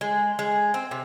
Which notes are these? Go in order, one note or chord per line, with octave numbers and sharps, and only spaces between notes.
G#3
G#3
C4
C3